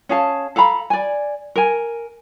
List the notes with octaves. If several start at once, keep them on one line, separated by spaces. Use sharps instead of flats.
C#4 G#4 F5 A5
A4 F5 A#5 B5
D5 G#5
A#4 G#5